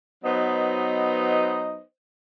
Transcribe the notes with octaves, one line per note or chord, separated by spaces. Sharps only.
F#3 B3 D#4 B4 C5 D#5